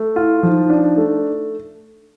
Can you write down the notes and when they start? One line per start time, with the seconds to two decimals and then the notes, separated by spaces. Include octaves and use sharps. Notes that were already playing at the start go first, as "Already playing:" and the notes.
Already playing: A3
0.15 E4 F4
0.42 F3 D#4 E4
0.70 D4
0.97 A3